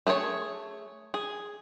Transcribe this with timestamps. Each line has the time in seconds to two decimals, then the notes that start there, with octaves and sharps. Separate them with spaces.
0.07 A3 G#4 C5 C#5
1.14 G#4